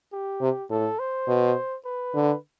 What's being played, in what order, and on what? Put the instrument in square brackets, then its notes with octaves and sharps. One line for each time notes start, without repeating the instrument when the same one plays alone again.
[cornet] G4
[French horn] C3
[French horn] A2 [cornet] A4
[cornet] C5
[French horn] B2
[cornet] B4
[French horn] D3